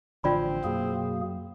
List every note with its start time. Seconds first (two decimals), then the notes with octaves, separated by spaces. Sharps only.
0.24 A1 D3 F3 C4 F4 D5 B5
0.64 F#2 B2 A#3 G#4